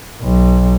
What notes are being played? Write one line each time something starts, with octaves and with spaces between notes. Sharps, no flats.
B1